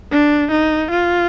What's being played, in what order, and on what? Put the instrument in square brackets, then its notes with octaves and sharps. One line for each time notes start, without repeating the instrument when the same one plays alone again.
[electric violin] D4
D#4
F4